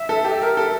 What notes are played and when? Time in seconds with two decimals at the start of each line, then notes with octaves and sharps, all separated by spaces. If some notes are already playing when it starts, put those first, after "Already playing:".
Already playing: E5
0.09 A4
0.25 G4
0.42 A#4
0.57 A4